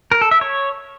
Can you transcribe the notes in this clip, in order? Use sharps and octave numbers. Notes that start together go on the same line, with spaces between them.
A#4
A4
E5
C#5